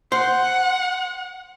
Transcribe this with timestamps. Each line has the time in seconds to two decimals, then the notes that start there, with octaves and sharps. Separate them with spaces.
0.12 C5 F#5